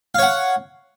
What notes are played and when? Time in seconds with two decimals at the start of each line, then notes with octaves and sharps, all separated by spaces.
0.15 F5
0.19 C#5
0.22 F#5